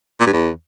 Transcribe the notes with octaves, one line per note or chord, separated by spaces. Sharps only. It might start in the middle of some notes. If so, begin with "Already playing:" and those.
A#2
G2
E2